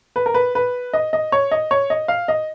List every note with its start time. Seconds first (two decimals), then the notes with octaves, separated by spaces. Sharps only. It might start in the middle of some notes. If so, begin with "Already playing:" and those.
0.16 B4
0.26 A#4
0.34 B4
0.55 B4
0.93 D#5
1.13 D#5
1.32 C#5
1.51 D#5
1.71 C#5
1.90 D#5
2.08 F5
2.28 D#5